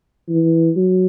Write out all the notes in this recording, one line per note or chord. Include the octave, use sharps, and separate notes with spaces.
E3
F#3